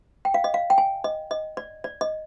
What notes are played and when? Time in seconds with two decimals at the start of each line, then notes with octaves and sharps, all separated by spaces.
0.25 G5
0.34 F5
0.44 D#5
0.54 F5
0.70 G5
0.78 G#5
1.04 D#5
1.31 D#5
1.57 D5
1.84 D5
2.01 D#5